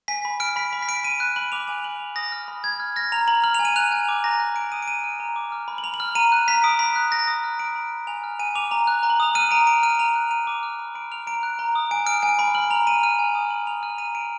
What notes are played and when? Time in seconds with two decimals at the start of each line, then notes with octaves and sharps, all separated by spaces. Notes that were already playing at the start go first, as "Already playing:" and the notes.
0.08 G#5 B6
0.25 B5
0.40 F6 D7
0.56 B5 B6
0.73 B5
0.82 B6
0.88 F6 D7
1.04 B5 D#7
1.20 F#6
1.36 B5 F#7
1.52 D6 F7
1.68 G#5 F7
1.84 F#6 F#7
2.00 G#5 F7
2.16 D#6 A#6
2.32 F6
2.48 B5
2.64 B5 G#6
2.80 F6
2.96 F6 A#6
3.12 A#5 F7
3.28 A#5 F#7
3.44 F6 F#7
3.55 G#5 F7
3.65 D#7
3.76 F#6 F7
3.92 G#5
4.09 D6
4.24 A#5 A#6
4.40 F#6
4.56 A#5 D7
4.72 D#6 D#7
4.83 D7
4.88 A#5 D#7
5.04 F6
5.20 A#5
5.36 D6
5.52 F6
5.68 B5
5.78 F#7
5.84 B5 F7
5.94 F#7
6.00 F6
6.15 A#5 D#7
6.32 F#6
6.48 A#5 B6
6.64 D#6 D7
6.79 B5 B6
6.96 F#6
7.12 B5 A#6
7.27 D#6 A#6
7.44 F6
7.59 B5 D7
7.76 B5
7.92 F6
8.07 G#5 F7
8.24 F6
8.39 G#5 D#7
8.55 D6 F7
8.71 A#5 F7
8.87 F#6
9.03 A#5
9.10 F#7
9.20 D#6 F7
9.35 F6 D#7
9.51 A#5 D7
9.67 A#5 D7
9.83 F6 D#7
9.99 A#5 F7
10.15 F#6
10.31 A#5 D#7
10.47 D6
10.63 F6
10.79 B5
10.95 B5 D7
11.11 F6 F7
11.27 A#5 D7
11.43 F#6
11.59 A#5
11.75 D#6
11.91 G#5 D7
12.06 F6 D7
12.23 G#5 D7
12.39 B5 D7
12.55 F6 F#7
12.70 A#5 F7
12.86 A#5 D#7
13.03 F6 D#7
13.19 G#5
13.35 D#6
13.50 G#5 F#7
13.67 B5 F7
13.83 F6 D#7
13.98 A#5 D#7
14.14 A#5 D7